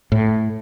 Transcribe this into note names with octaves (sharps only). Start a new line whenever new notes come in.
A2